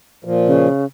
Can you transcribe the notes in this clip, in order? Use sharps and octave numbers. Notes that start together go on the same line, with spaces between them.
A#2 F3
C#3